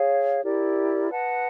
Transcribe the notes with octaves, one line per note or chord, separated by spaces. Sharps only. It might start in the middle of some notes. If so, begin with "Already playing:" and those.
Already playing: G#4 C#5 F5
E4 G4 A#4 D5
B4 D#5 F#5 A5